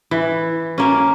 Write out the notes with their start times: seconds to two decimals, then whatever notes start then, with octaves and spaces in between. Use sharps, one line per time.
0.11 E3
0.78 A#3 C#4